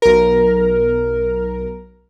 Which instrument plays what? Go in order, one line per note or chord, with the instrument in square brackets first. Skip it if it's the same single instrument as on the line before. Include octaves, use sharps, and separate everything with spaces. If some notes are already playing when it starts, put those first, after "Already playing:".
[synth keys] B1 A#4